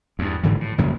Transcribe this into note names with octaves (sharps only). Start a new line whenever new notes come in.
E2 G2
G#1 G#2 D3 E3
A2
A#1 F#2 C#3 A#3